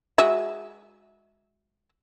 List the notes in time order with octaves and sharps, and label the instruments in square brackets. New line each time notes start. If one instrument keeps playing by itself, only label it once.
[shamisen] G#3 F#4 E5